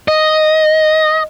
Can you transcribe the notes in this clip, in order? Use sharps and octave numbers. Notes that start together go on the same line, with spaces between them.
D#5